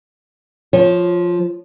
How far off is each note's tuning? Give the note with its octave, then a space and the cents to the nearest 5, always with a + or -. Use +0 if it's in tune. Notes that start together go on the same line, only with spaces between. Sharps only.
F3 +5 C#5 -15